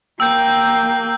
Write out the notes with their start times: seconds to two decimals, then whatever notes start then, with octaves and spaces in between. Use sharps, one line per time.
0.20 A#3 G5 E6 G6